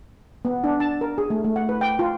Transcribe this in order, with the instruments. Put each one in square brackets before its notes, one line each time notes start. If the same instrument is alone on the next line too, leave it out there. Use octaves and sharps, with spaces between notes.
[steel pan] B3
D4
A5
A#4
G#4
A3
A3
F#5
B4
G5
F4